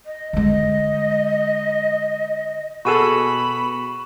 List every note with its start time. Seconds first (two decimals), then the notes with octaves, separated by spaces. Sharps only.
0.05 D#5
0.33 D3 G#3 D#5
2.85 B2 F#4 G#4 A4 B5 C#6 D#7 E7